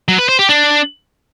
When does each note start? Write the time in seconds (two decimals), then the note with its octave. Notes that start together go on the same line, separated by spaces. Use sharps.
0.08 F#3
0.19 B4
0.29 C5
0.39 G4
0.49 D4